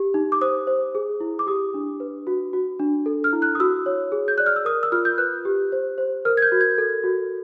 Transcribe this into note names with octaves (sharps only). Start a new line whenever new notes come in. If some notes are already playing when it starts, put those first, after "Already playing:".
Already playing: G4
D#4
D6
C5 D#6
C5
G#4
E4
D6
G4 D#6
D4
B4
F#4
F#4
D4
A4
F6
E4
F#6
D#6
F#4 E6
C#5
G#4
G6
D5 F#6
F6
E6
A#4 D#6
E6
F4 F6
G6
B4 F#6
G4
C5
C5
A#4 F6
G#6
G6
F#4
G#6
A4
F#4